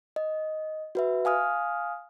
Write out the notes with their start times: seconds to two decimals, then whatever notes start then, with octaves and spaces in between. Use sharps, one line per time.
0.16 D#5
0.95 F#4 B4 E5
1.25 F5 G#5 D#6 F6